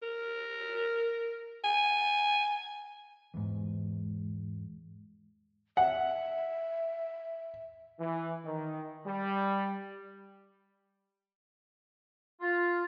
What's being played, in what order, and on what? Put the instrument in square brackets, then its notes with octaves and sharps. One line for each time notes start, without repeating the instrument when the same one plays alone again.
[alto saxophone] A#4
G#5
[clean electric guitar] E2 G#2
[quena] E5 [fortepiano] F#5
[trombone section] E3
D#3
G3
[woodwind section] F4